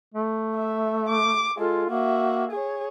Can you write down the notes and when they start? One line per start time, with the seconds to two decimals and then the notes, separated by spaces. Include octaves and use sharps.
0.14 A3
0.56 E5
1.09 D6
1.57 G#3 F4 A4
1.90 A#3 F#4 E5
2.51 G#4 C#5